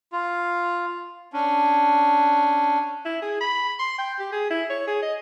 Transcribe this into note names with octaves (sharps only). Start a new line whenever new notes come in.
F4
C#4 D4
E4
G#4
B5
C6
G5
G4
G#4
E4
C#5
G#4
D#5